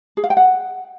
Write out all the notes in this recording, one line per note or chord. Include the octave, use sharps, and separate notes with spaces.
G#4
F5
G5
F#5